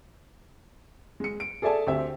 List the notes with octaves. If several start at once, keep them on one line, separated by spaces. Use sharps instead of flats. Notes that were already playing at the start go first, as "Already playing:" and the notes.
G#3 C#7
D7
G#4 A4 D5 E5 G#5 A5
D2 C4 G4 E5